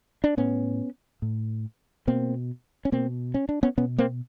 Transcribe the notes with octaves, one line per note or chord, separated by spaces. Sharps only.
D4
A2 B3 C#4
A2
B2 A#3 C4
C#4
B2 A#3 C4
C#4
D4
B3 C#4
B2 B3 C#4
A#3 C4